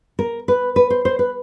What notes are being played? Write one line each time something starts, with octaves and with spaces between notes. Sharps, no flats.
A#4
B4
B4
C5
C5
B4